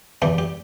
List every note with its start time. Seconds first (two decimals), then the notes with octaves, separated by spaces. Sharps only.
0.22 E2 E3 G3 G4
0.38 G4